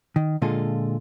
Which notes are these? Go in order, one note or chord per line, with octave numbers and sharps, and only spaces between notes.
D#3
A#2 D3 G#3 F4 G#4 A4